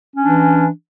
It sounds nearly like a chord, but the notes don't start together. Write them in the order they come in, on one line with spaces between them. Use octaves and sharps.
C#4 D4 E3